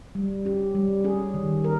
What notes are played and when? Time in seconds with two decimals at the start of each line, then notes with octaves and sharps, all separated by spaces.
0.15 G3
0.45 C#4 G4
0.75 G3
1.04 C#4 G#4
1.34 D#3
1.64 A#4